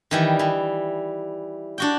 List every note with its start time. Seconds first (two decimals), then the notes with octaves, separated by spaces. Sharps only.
0.11 D#3 E3 G3
0.39 E3
1.78 D4 F#4 G5